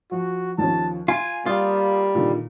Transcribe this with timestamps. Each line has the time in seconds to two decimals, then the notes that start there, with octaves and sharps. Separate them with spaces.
0.12 F3 F#4
0.58 D#2 F3 C#4 A5
1.08 F4 G#5 C6
1.46 G3 A#3 F4 F5 D#6
2.15 A#2 D3 D#3